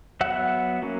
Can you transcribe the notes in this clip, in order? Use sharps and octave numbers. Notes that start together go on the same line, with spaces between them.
F#3 B3 E5 F#5
F#3 A#3 C#4